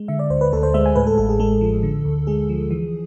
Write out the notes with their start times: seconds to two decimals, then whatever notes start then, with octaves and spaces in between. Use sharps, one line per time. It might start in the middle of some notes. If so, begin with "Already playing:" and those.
Already playing: G#3
0.08 D3 E5
0.19 D5
0.30 D2 C5
0.41 B4
0.53 D2 A4
0.63 C5
0.74 G#3 E5
0.86 G#5
0.96 A2 B4
1.07 A4
1.18 A1 A4
1.29 G#4
1.40 G#3 A4
1.61 F3
1.83 D3
2.05 D2
2.27 G#3 G#4
2.49 F3
2.71 E3